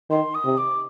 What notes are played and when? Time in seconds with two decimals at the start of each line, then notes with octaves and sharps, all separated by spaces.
0.10 D#3 C6
0.34 D#6
0.45 C3
0.57 D6